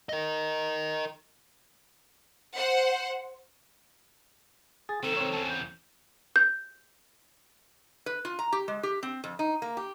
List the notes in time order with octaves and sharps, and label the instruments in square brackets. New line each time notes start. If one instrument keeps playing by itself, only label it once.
[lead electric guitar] A#4 D#5
[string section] C5 F#5
[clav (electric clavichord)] G#4 [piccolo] A6
[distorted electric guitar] D#3 F#3 [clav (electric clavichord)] C4 [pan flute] A4 [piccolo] E7
[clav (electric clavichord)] C4 C#5
[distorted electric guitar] E2 C#3 [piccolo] A5
[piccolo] G6
[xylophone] G6
[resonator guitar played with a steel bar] B4
F4
A#5
G4
G#3
G4
C4
F2
D#4
A#3
G4